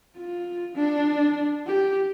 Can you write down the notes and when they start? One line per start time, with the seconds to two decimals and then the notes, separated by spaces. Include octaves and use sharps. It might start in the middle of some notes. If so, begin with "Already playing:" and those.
0.16 F4
0.75 D4
1.67 G4